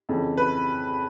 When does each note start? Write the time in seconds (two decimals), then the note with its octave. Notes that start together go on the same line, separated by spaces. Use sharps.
0.09 F2 C#3 E3
0.37 B4